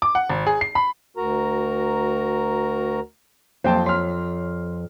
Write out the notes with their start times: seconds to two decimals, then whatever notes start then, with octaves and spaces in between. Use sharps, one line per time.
0.02 D6
0.15 F#5
0.30 G#1
0.47 G#4
0.61 C7
0.75 B5
1.17 D2 F#4 A#4 A#5
3.64 F2 F#3 A#3 F4 C5 G5 A5
3.86 C#5 C6 F6